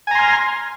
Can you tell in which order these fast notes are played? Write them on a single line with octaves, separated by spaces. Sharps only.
G#5 A#5 C6 F6